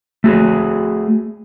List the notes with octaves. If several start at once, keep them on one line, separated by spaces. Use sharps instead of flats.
A3 F#4 G#4